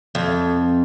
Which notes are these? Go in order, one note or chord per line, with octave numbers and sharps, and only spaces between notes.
F2